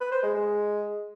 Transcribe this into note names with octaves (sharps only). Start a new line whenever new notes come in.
B4
C5
G#3
G#3